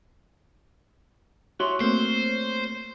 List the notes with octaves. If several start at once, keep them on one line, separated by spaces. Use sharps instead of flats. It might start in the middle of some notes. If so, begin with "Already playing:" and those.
E4 F#4 C#5 C6
A3 A#3 C4 C5